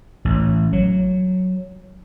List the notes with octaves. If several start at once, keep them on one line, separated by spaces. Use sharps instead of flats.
A1
F#3